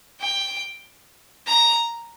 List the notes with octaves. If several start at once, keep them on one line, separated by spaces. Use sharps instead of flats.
G5
A#5